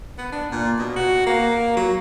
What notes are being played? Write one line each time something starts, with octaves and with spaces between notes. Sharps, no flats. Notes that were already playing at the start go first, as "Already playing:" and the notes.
B3
D4
A#2
B2
F#4
A#3
F#3